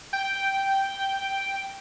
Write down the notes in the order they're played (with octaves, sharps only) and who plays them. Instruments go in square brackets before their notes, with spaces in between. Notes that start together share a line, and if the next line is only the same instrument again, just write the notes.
[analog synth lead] G5